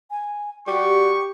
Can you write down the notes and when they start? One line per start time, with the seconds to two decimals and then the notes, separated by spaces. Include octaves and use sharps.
0.11 G#5
0.67 G3 F#4 G4 C#6